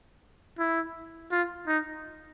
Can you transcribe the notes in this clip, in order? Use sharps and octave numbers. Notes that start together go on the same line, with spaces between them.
E4
F4
D#4